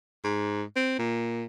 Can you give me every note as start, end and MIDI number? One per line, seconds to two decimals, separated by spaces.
0.24 0.63 44
0.76 0.94 60
0.99 1.45 46